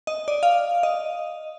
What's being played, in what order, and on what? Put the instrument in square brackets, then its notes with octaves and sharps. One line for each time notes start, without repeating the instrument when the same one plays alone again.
[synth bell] D#5
D5
F5
D#5